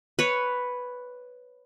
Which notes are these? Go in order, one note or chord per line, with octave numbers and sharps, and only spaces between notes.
B4 C#5